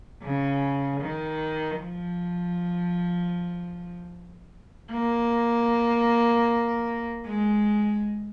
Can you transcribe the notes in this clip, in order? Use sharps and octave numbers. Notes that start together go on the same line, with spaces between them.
C#3
D#3
F3
A#3
G#3